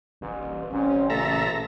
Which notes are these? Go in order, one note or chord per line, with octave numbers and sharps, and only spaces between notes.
D#1 A1
A1 C4 C#4
A#2 C#3 A3 A4 E5 A#5